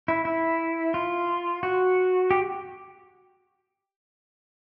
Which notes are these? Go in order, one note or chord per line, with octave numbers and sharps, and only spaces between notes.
E4
E4
F4
F#4
G4